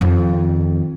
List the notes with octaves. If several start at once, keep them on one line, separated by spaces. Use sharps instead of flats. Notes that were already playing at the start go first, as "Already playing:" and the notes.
F2 D#3